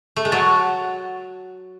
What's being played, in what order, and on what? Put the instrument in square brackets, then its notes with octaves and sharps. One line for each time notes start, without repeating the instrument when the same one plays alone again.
[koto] A3
G#3
[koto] F#3 [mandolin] F#4 C#5 F#5 A5